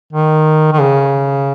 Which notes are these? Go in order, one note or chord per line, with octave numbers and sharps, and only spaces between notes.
D#3
D#3
C#3